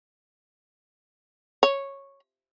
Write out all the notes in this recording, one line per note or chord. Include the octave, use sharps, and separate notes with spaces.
C#5